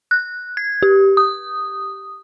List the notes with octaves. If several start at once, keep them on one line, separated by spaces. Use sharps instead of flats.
F#6
G#6
G4
D#6